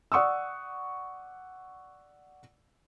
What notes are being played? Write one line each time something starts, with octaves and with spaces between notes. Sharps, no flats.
D5 F#5 C#6 D#6 E6